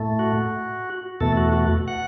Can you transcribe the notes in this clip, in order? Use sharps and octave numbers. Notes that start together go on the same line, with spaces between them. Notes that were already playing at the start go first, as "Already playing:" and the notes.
Already playing: A2 A3
F#4
E2 B2 A3 A4
F#4
F#4
F#5